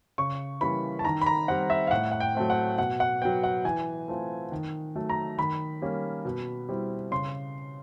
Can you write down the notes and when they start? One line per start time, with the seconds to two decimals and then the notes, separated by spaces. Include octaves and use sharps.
0.18 C#3 C#6
0.61 E3 G3 A#3 C#4 B5
0.99 A5
1.04 D#3 A#5
1.21 B5
1.26 A#5
1.48 G3 C4 F#5
1.70 E5
1.87 F5
1.91 A2 F#5
2.11 F#5
2.20 G5
2.35 F#3 A3 C4
2.50 F#5
2.78 B2 F#5
3.00 F#5
3.21 F#3 B3 G5
3.44 F#5
3.65 E3 G#5
4.08 A3 C4 F4
4.52 D#3
4.96 F#3 A3
5.10 A#5
5.38 D#3 B5
5.82 G3 A#3 C#4
6.25 B2
6.69 G3 C4 E4
7.11 C#3 C6